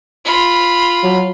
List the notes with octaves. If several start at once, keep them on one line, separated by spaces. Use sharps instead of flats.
F4 B5
F#3